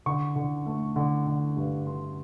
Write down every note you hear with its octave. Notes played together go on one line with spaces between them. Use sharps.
D3 C#6
D3
A3
D3
D3
G2
D3 C6